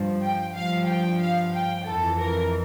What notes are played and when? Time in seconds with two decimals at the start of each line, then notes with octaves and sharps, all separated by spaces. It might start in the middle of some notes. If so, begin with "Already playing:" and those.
Already playing: G2 F3
0.22 G5
0.55 G2 F3 F5
0.88 G5
1.21 F5
1.54 G5
1.87 F2 E3 A4
2.20 A#4